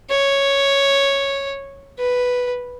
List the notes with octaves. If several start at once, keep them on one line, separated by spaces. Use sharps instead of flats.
C#5
B4